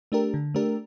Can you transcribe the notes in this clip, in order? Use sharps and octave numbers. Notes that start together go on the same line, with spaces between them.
A3 D4 G4 A#4
D3
A3 D4 G4 A#4